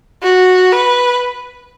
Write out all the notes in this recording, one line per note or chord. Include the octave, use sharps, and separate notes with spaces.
F#4
B4